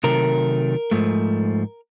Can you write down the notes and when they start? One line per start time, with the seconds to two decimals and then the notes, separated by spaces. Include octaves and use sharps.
0.04 C3 D#3 F#3 A3 A#4
0.91 G#2 F3 A3